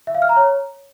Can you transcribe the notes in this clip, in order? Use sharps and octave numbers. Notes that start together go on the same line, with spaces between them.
E5
F5
F6
A#5
C#5